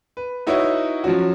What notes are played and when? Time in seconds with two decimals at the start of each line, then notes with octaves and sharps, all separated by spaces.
0.17 B4
0.47 D#4 E4 F#4 B4 C#5
1.04 F3 F#3 C#4 F#4